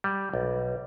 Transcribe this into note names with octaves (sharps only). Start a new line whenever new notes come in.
G3
B1